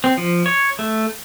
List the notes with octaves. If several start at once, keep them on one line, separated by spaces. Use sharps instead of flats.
C4
F3
C#5
A3